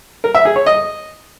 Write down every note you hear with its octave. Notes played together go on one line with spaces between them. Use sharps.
A#4
E5
G#4
C#5
D#5